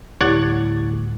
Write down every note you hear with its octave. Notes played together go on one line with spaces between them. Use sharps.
D2 A2 G3 E4 G4 C#5 D5 F#5